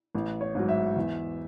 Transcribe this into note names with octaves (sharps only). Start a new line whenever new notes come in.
A1
C#5
G#2 F#3
E5
E2